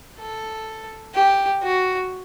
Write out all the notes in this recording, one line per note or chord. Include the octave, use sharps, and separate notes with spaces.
A4
G4
F#4